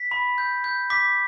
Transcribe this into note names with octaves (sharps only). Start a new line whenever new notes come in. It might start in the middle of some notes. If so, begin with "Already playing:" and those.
Already playing: B6
B5
G6
G6
D6 B6